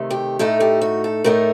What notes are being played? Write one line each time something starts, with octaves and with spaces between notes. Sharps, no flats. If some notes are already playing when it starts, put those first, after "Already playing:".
Already playing: C3 D#3 A3
G4
A2 A3 D#4 A4
G4
F#4
A4
A2 A3 D#4 A#4